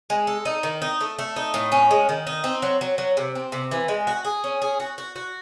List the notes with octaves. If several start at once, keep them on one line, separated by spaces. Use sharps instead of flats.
G#3
A4
D#4
D#3
D#4
A3
A3
D#4
A2
C#4
G#3
D#3
D#4
C4
F#3
F#3
F#3
C3
C4
C3
E3
G#3
F#4
G#4
C#4
G#4
F#4
F#4
F#4